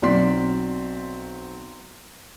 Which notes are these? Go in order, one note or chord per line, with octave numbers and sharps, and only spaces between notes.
B1 F#3 C4 D5 C6 B6